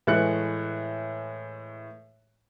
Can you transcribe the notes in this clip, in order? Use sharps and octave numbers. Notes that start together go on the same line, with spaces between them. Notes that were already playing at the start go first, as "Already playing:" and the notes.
A2 E3 G#3 A3 F#6 C#7